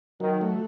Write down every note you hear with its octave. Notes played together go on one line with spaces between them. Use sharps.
D#3 F#3
A3